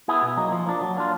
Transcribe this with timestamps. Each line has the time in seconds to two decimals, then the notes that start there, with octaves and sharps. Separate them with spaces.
0.08 B3 E4 G#4
0.22 B2
0.37 F#3 A#3 D#4
0.52 F3
0.66 A#3 D4
0.82 F#3
0.97 A#3 D4 F4